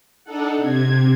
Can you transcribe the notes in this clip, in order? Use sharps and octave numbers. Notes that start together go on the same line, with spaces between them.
D4 D#4 A4 F#5
C3 G#6